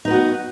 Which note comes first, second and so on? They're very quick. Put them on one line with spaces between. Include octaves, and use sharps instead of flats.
D#4 B4 F#4 B3